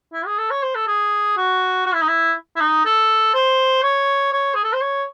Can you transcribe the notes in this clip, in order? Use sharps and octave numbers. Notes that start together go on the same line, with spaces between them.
E4
G#4
A4
C#5
C5
A4
G#4
F#4
F#4
E4
D#4
E4
E4
D#4
A4
C5
C#5
C#5
G#4
A4
C5
C#5